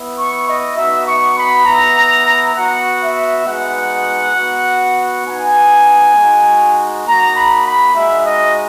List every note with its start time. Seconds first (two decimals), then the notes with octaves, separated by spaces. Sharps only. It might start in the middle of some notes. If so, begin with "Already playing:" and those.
Already playing: B3 E4
0.15 C#6
0.45 D#5
0.74 B3 D#4 F#4 E5
1.05 C#6
1.35 B5
1.65 B3 E4 A#5
2.54 B3 F#4 F#5
3.00 E5
3.44 G#3 B3 D#4 F#4 F#5
4.34 B3 F#4
5.24 B3 D#4 F#4 G#5
6.14 G#3 D#4 F#4
7.04 A#3 D#4 F#4 A#5
7.34 B5
7.64 B5
7.94 G#3 D#4 F#4 E5
8.24 D#5